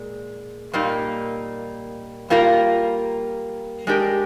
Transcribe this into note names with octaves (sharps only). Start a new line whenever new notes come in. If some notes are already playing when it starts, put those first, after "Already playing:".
Already playing: A#2 G#3
A#2 G3 A#3 D#4
G3 A#3 F4 A#4
G#3 D4 G4 A#4